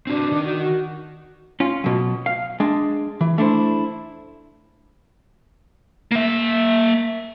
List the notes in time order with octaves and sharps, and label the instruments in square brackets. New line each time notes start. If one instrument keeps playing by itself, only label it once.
[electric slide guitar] C4 F#4 B4 [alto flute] D4
[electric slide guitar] D#3 D#4
[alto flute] F#4
F#4
[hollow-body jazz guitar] C#4 F4
B2 F#3
F5
G#3 D4
E3
A3 D4 E4 C5
[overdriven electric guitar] A#3 E5